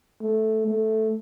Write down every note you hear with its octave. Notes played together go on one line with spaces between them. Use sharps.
A3
A3